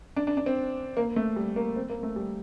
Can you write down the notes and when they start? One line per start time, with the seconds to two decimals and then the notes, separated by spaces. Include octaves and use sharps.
0.16 D4
0.27 D4
0.37 D4
0.46 C4
0.97 A#3
1.16 A3
1.36 G3
1.56 A#3
1.76 C4
1.90 A#3
2.03 A3
2.16 G3